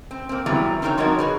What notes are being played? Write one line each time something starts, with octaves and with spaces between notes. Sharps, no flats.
C4
A#3 C4
E2 F#3 G3 B3 E4 A#5
C4 D#4 F#4 A#4 B4 C#5
F3 G3 D#4 F#4 A#4 C#5
F#4 G#4 B4